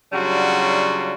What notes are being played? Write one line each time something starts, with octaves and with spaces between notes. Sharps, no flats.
C#3 F#3 G3 D4 F4 F#4